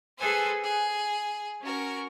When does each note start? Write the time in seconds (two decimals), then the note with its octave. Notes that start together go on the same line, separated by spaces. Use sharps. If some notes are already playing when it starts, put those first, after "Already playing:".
0.17 G#4 A4 B4 C5 G#5
0.63 G#4
1.62 C#4 F#4 A#4